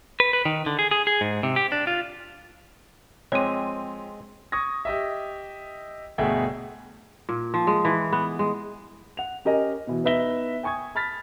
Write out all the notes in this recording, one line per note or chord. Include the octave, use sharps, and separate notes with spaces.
B4
B4
D#3
D3
G#4
G#4
G#4
G#2
C3
G4
D4
F4
F2 G#3 C4 C#5 D6 D#7
C#6 D#6 G#6 A#6
G4 D#5 E5
G1 B2 A3 G#4 E5 G5
A#2
F3
G#3
E3
B3
G#3
F#5 F7
C#4 G4 A#4 D#5 G#5
B2 E3
B3 D#4 B4 E5 A#6 G7
G5 G#5 C#6 D#6 G#6
A5 B5 F6 A6 B6